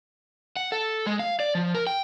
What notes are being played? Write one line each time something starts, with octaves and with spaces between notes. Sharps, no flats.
F#5
A4
G#3
F5
D5
F3
A#4
G5